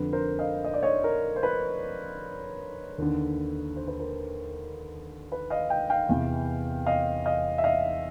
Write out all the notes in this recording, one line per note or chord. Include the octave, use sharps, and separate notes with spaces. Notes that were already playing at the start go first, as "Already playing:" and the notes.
Already playing: F2 D3 B4
A#4 C5
D#5 F5
D#5
D5
C#5 D#5
A#4
C5
B4
D#2 D3
C5
B4
A#4 C5
B4
D#5 F5
F5 G5
F5 G5
E2 C3 E3
D#5 F5
D#5 F5
E5
D#5 F5